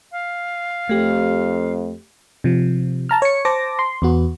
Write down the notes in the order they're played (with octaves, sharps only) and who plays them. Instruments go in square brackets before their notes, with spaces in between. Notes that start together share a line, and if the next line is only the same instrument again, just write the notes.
[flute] F5
[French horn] F2 [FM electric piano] A3 G4
[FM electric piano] C3 F3
A5 A#5 F6
C#5 C#7
C5 A5 D6 A#6
C6
E2 B3 F#4